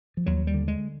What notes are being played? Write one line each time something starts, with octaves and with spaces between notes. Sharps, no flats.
F3
D#2 F#3
G3
D3
G#3